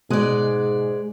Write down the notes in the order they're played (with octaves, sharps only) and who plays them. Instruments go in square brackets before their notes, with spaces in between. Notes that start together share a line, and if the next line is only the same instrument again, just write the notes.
[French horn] G#2 [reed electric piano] B2 D#6 F#6 [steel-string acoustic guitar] G#3 D5